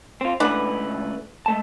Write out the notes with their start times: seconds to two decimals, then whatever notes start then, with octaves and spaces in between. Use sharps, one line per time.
0.21 C4 F4
0.40 C#2 E3 A3 D4 B4 F#5
1.46 G#3 A3 A5